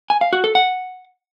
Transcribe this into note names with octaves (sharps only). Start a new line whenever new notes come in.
G#5
F5
F#4
A4
F#5